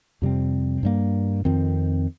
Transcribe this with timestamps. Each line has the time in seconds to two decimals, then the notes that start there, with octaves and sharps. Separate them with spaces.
0.22 F2 C3 G3 C4
0.83 G2 G3 A#3
1.45 F2 D#3 C4